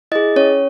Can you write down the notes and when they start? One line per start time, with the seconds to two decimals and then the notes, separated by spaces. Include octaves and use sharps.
0.12 E4 G#4 D#5
0.36 C#4 C#5